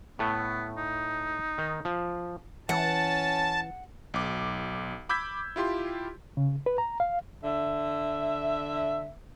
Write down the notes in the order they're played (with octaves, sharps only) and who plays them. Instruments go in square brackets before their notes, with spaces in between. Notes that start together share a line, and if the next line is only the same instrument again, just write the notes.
[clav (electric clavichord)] A2 A3 [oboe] B3
[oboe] D#4
[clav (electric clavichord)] D#3
F3
[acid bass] E3 [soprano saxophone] C#4 [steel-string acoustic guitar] F#5 [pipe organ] A5
[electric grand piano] B1 D6
B5 D6 E6 G6 G#6 B6
E4 F4 G4 C6
[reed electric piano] C#3
B4
A#5
F5
[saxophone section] D3 E5